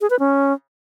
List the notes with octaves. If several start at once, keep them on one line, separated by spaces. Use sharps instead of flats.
G#4
B4
C#4